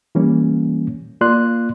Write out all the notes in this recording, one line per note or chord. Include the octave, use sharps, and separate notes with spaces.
E3 G3 A#3 C#4
A#3 F4 D5 C6 F#6